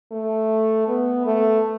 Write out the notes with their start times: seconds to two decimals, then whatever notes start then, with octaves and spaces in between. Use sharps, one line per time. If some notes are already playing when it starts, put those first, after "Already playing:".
0.12 A3
0.88 B3
1.26 A3